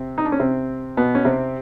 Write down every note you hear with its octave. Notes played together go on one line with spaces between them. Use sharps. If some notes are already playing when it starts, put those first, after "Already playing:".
Already playing: C3 C4
D#4
D4
C#4
C3 C4
B2 B3
C#4
C3 C4